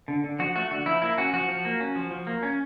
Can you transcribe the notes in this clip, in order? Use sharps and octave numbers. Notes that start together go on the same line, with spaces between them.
D3
D3
F3 F#4
A3 F#4
D3 F#4
F3 E4
A#3 E4
C#4 F#4
F3 F#4
F3
A#3
C#4
F3
F3
A#3
C#4